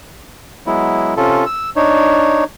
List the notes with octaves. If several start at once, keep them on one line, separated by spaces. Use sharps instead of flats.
F#3 G#3 B3 E4
C3 C#4 F4 A4
E6
D4 D#4 C#5